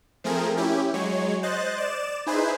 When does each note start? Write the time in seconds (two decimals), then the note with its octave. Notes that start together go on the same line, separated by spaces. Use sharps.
0.24 F3 A3 C4 G#4 A#4
0.57 C#4 E4 G4
0.94 F#3 G#3 C#5
1.43 C5 D#5 F#6 A6
1.78 D5 E7
2.27 D#4 E4 G#4 B4 C5